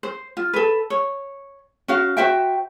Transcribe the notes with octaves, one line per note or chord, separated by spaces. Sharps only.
C5
F4
A4 B4
C#5
C#4 F#4 F5
F#4 C5 E5 G5